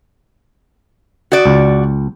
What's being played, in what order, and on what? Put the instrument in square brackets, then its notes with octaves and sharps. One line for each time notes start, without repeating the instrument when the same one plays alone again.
[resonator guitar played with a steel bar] F#4 D5
[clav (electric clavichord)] C#2